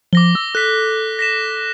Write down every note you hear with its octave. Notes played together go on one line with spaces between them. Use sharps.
F3 D6 A#6 G7
E6
A4 F#6 B6
A#6 B6 E7